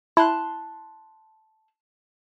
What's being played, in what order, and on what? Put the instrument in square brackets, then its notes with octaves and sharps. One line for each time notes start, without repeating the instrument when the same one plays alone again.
[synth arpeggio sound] E4 [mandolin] A5 C6 F#6